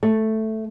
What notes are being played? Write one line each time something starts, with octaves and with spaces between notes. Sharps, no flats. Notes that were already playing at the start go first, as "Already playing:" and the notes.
A3